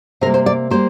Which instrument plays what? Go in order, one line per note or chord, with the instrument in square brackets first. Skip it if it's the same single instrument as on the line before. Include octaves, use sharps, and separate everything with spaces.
[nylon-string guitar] C3 G3 A#3 A#4
C5
D5
G3 A#3 C5